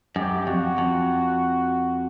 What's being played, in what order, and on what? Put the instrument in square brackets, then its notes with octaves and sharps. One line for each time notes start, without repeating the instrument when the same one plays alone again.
[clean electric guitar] F#2 [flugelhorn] G4
[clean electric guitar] F2 [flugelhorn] F#4
[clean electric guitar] F2